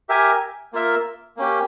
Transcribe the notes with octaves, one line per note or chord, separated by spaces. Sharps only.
G4 A#4 E5 G#5
A#3 F4 A#4 E5
A#3 C#4 G4